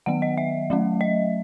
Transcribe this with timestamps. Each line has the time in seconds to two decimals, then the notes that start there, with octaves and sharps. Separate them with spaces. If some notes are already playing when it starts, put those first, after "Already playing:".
0.06 D#3 F#3 B3 F#5
0.22 D#5
0.38 E5
0.70 F#3 A3 C#4
1.01 D#5